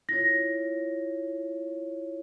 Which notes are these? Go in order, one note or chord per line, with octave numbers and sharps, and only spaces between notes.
E4 F4 C#5 A#6